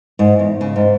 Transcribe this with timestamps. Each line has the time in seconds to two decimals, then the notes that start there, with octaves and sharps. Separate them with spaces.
0.19 G#2
0.39 E2
0.61 C#3
0.76 G#2